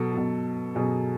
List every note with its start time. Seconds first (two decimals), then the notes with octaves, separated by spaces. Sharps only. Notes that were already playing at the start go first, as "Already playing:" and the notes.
Already playing: B2 F#3 A4
0.13 B2 F#3
0.75 B2 F#3 G#4